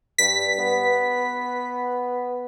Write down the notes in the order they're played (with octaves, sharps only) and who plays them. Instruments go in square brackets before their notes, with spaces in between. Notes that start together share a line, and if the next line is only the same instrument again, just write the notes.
[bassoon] G2 [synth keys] B6
[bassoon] B3